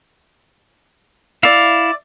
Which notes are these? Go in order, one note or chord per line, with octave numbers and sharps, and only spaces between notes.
E4 D5 E5 F5